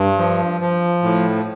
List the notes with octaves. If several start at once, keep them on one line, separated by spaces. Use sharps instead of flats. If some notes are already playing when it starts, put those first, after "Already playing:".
Already playing: G2
F3
F3
A2